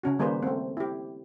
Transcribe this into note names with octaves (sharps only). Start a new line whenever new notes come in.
C#3 C#4 F#4
D#3 G3 A#3 G#4 B4 C5
A3 C4
E4 G4